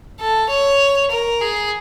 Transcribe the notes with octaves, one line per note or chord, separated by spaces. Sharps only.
A4
C#5
A#4
G#4